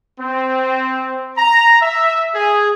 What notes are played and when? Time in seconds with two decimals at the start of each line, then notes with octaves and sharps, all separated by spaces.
0.19 C4
1.37 A#5
1.81 E5
2.34 G#4